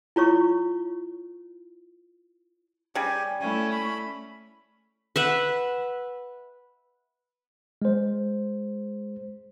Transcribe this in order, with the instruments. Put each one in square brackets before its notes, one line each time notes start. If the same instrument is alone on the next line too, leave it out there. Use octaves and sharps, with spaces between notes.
[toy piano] E4 F4 C#5 C#6
[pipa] C#3 G3 [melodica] G4 G#5
[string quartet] A3 C#4 E4 [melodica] G#5
[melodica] B5
[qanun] B4 E5 F#5
[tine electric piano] G#3 C5